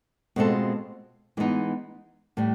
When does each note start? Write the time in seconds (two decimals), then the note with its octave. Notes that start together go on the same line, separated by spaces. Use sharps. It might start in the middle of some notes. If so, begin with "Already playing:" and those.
0.36 B2 G#3 C4 F4 A4
1.37 E3 G#3 B3 D#4
2.37 A2 E3 G3